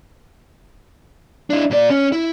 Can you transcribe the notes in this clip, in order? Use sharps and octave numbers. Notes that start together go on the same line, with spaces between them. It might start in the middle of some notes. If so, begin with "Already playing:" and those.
D4 E4
A#2 D5
C#4
E4